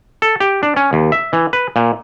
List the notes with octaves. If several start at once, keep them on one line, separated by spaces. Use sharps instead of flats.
A4
G4
D4
C#4
D#2
E5
E3
B4
A#2